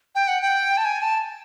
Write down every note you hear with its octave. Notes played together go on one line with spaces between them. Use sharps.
G5
F#5
G5
A5
G#5
A5